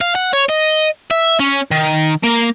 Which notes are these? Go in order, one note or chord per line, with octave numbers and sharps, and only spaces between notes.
F5
F#5
C#5
D#5
E5
C#4
D#3
A#3